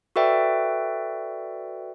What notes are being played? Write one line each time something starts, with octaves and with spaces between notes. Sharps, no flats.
F#4 A4 B4 D5 E5 G5